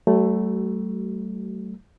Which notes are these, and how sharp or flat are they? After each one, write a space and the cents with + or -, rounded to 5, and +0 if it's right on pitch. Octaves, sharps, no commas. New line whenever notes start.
F#3 +45 A3 +0 F#4 +35